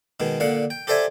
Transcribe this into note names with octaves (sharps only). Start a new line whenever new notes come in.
B2 D#3 G#3
A#2 D3 F5 F#5
G5
G4 A4 C5 D5 E5 G#5